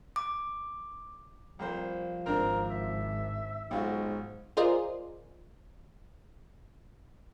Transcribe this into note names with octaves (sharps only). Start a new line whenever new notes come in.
D6
C2 F3 A#3 C5
G#1 C4 D4 A#4
E5
B1 G#2 F4 F#4
F4 G#4 A#4 C5 D5 D#5